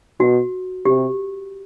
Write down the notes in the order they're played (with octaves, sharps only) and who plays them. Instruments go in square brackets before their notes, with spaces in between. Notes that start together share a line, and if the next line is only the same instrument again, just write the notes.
[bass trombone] B2 [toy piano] F#4
[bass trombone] C3 [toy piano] G4